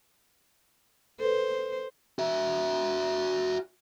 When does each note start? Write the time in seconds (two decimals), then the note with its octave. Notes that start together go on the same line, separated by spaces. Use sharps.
1.20 A4 B4 C5
2.19 F#4 E5